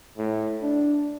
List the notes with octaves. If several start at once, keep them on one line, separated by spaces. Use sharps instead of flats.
A2
D4